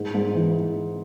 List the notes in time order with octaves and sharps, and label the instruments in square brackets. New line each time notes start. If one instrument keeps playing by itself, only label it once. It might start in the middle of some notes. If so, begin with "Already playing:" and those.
Already playing: [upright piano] G#2 G#3
G#2
E3